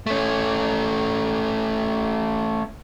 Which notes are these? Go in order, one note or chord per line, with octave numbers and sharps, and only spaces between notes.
A3 C#4